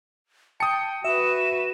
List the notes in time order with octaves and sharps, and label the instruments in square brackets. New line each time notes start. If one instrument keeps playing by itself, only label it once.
[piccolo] G5 [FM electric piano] A5 [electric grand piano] D#6 C#7
[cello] F#4 B4 [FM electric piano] E5 [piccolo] E7